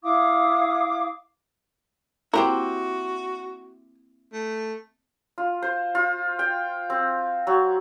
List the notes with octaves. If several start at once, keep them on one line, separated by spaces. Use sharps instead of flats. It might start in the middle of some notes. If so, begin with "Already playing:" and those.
E4 F5 D6 D#6
A#3 C4 E4 F#4 G4 A#4 C5 F#6
A3
F4
C5
F4
G5
C4
F#3